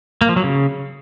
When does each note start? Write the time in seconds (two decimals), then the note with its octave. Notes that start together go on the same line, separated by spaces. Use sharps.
0.21 A#3
0.29 F3
0.36 F#3
0.44 C#3